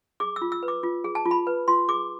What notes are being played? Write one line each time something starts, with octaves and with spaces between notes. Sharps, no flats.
G#4 D6
E6
F4
E6
B4
D6
F4
G#4
A5
F4
B5
B4
F4 C6
G#4 D6